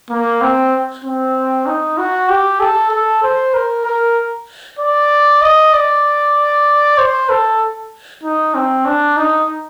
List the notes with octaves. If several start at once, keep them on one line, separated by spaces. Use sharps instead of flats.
A#3
C4
C4
D#4
F#4
G4
A4
A4
C5
A#4
A#4
D5
D#5
D5
C5
A4
D#4
C4
D4
D#4